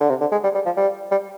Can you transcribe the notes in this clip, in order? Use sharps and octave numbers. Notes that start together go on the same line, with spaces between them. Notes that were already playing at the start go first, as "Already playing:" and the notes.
D3
C3
D3
G#3
G3
G3
F3
G3
G3